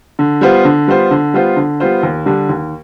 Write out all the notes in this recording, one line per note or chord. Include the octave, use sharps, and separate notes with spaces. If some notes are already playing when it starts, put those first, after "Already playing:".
D3
G3 B3 F4 C5
D3
G3 B3 F4 C5
D3
G3 B3 F4 C5
D3
G3 B3 F4 C5
D#2
D3 G3 D4
D#2